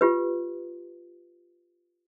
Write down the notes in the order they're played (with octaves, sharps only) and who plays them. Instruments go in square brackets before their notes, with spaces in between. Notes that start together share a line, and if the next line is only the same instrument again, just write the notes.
[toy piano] F4 G4 B4